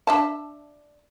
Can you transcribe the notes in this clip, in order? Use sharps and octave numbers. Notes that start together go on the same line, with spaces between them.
D4 E5 A5